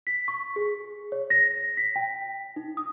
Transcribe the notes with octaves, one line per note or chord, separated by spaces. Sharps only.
B6
C#6
G#4
C#5
A#6
B6
G5
D#4
D#6